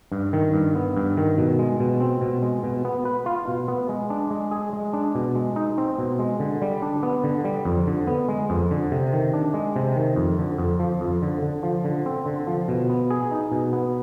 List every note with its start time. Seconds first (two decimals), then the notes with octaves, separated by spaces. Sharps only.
0.12 G2
0.33 D#3
0.54 G2
0.75 B3
0.96 G2
1.17 D#3
1.38 B2
1.59 G#3
1.80 B2
2.00 C4
2.21 B2
2.42 G#3
2.63 B2
2.85 B3
3.05 B4
3.26 F4
3.48 B2
3.68 B3
3.89 G#3
4.10 D4
4.31 G#3
4.51 G#4
4.73 G#3
4.93 D4
5.15 B2
5.35 G#3
5.56 D#4
5.78 C4
5.98 B2
6.19 G#3
6.40 D3
6.62 G3
6.82 D4
7.03 B3
7.24 D3
7.44 G3
7.65 F2
7.87 D3
8.07 B3
8.28 G#3
8.50 F2
8.71 D3
8.91 C3
9.13 D#3
9.34 D4
9.54 G#3
9.76 C3
9.96 D#3
10.16 F2
10.38 D3
10.58 F2
10.80 F3
11.01 F2
11.22 D3
11.42 D3
11.63 F3
11.84 D3
12.06 C4
12.26 D3
12.47 F3
12.68 B2
12.89 B3
13.11 G#4
13.31 D#4
13.52 B2
13.73 B3